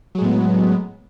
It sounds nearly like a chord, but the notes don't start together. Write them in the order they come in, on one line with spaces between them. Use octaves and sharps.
F#3 G#3 A2 B3